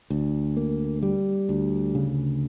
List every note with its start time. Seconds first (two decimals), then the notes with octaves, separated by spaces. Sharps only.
0.10 D2
0.57 A#3
1.03 G3
1.49 D2
1.95 C#3